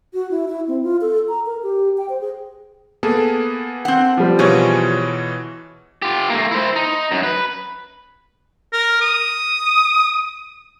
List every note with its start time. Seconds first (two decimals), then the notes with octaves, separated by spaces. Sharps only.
0.14 F#4
0.31 E4
0.48 E4
0.68 C4
0.83 F4
1.01 A4
1.29 A#5
1.46 A#4
1.63 G4
1.98 G5
2.09 C5
2.21 G#4
3.03 A#3 B3 G#4 A4
3.85 C4 F#5
4.17 F3 G3
4.39 B2 E3 F4 G#4 C#5
6.02 F4 G4
6.30 A3 A#3
6.51 E4 C5
6.76 D#4
7.11 F#2
7.23 B4
8.73 A#4
9.01 D#6